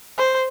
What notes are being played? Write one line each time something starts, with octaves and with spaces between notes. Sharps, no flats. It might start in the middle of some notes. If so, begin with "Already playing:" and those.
C5